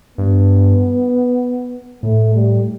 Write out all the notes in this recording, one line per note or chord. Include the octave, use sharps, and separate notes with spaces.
G2 B3
A2 A3
G3